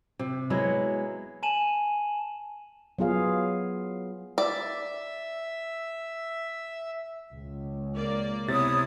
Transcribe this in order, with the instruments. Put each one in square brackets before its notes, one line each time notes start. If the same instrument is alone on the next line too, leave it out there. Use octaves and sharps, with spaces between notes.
[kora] C3
F#3 G#3 B3 E4
[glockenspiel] G#5 A5 D#7 E7 F#7
[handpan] F#3 B3 F4 G#4 F5
[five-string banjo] D5 [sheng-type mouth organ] E5
[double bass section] C#2
[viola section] A#3 D5
[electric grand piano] C3 A6 [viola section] B3 E4 [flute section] C#5 D#6